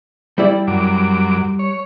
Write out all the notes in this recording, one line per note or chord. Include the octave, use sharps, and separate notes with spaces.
G3 E4 D5
F#2 D6
C#5